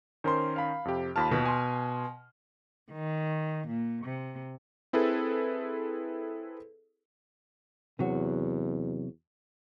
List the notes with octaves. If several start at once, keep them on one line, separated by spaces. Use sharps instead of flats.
D#3 C#4 A#4 C5 C6
F5 B5
F2 C3 G4
D#2 F4 A5 B5 F6
B2
G#5 C6
D#3
A#2
C3
C4 E4 G#4 A4 B4
E2 C3 F#3 F#4